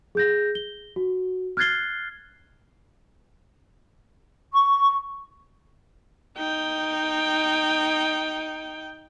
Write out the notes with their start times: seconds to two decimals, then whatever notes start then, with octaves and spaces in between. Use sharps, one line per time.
0.15 G#4 G6 A#6
0.55 G7
0.96 F#4
1.57 F6 F#6 G#6 A6 C7 G7
4.53 C#6
6.38 D#4 G5